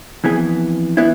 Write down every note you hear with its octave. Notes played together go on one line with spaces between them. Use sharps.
F2 E3 B3 G#4
E3 B3 E4